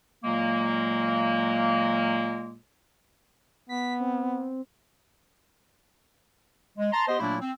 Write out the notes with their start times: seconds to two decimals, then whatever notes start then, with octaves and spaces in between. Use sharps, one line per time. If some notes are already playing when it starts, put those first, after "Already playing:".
0.24 A#2 F#3 G#3 A#3
3.69 B3 B6
4.00 C4
6.78 G#3
6.92 A5 A#5 C6
7.07 B3 G4 C5 D#5 C6
7.19 A#2 F#3 A3 A#3 D4 E4
7.41 C4